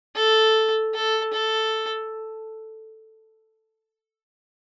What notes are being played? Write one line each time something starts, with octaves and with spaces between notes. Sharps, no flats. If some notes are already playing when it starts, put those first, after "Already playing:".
A4
A4
A4